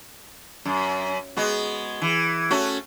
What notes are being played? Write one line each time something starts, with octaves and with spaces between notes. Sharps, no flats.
F#2
G#3 B3 F#4
E3
A3 C#4 F#4